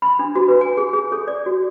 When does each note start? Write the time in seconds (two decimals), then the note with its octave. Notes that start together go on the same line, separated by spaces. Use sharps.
0.02 B5
0.19 D4
0.35 F#4
0.48 B4
0.61 G#5
0.77 G#4
0.93 G#4
1.12 A4
1.27 D5
1.46 F#4